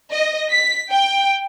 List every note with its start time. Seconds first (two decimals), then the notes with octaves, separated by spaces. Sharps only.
0.11 D#5
0.51 B6
0.92 G5